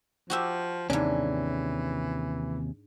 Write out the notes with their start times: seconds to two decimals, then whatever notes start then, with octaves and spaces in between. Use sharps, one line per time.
0.30 F3 F#4 G4 E5
0.90 D#2 G#2 C3 E3 C#4 D4